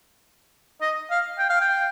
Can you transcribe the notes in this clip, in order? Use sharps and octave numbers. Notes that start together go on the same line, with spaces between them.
D#5
F5
G5
F5
G5